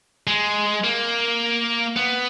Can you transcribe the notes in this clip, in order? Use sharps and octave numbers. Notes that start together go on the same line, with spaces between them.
G#3
A#3
B3